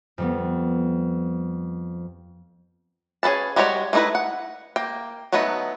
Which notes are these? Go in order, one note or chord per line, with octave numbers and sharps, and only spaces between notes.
F2 G3 B3
C#4 G#4 A4 B4 A5
G3 G#3 F#4 G4 C#5
A3 A#3 D#4 E4 B4
F#5
A#3 G5
F#3 A3 B3 D#4 B4